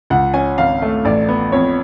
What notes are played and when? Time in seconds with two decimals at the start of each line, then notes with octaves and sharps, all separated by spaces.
0.10 C#2 F#5
0.34 C#4 G#5
0.58 G#1 F5
0.82 A3
1.05 A1 D5
1.29 B3
1.52 F2 C#5